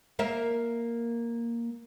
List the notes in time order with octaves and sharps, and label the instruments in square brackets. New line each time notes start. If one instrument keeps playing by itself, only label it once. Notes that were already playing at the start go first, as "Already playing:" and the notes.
[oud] A#3 E5